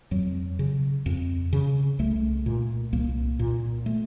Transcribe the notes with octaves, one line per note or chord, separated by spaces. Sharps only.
F2 F#3
C#3
F2
C#3
C2 A3
A#2
C2 A#3
A#2
A3